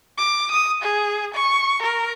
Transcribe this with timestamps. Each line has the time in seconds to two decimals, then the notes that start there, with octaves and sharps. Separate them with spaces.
0.18 D6
0.52 D#6
0.83 G#4
1.34 C#6
1.83 A#4